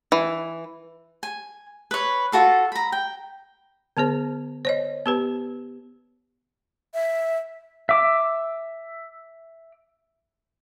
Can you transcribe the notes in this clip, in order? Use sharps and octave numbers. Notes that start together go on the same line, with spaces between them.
E3
G#5
B4 C#5
F4 F#4 A4 F5
A#5 B5
G5
D3 B3 G#4 C5
C5 C#5 D#5
B3 G4 B4
E5
E5 D6